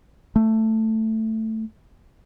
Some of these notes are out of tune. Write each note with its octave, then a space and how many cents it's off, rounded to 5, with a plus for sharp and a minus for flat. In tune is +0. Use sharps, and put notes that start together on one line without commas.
A3 +10